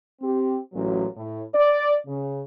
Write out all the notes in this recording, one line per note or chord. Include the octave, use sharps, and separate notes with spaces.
C4 G4
A1 A#2 F#3
A2
D5
C#3